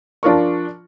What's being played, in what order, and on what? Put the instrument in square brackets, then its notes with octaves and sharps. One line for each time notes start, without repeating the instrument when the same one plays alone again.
[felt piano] F3 D4 F4 A#4 C#6